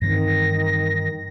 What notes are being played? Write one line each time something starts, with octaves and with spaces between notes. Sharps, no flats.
G2 D#3 E3 C4 A#6